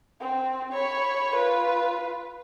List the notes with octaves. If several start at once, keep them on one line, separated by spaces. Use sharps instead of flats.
C4
C#5 B5
F4 B4